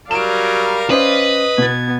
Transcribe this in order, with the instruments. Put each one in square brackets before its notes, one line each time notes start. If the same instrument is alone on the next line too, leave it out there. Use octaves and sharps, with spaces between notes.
[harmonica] F#3 G3 A#4 [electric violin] D5 F5 [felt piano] D7 E7
[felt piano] C#4 C5 [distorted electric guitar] B4 [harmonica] D#5
[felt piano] B2 A6 [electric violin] B3 G#6